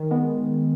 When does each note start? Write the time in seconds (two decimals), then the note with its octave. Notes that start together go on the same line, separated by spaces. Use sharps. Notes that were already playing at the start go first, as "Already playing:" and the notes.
Already playing: D#3
0.11 G#3 B3